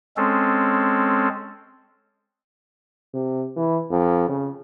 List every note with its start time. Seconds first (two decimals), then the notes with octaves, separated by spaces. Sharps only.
0.17 G#3 C4 C#4 A4
3.14 C3
3.56 E3
3.90 F2
4.28 C#3